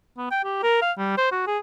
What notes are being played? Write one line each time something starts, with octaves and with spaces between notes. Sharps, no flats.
B3
G5
G4
A#4
F5
G3
C5
F#4
G#4